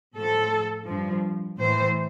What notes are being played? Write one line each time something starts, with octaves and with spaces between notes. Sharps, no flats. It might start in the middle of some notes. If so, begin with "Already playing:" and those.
A2 F3 A4
G2 F3
A2 E3 C5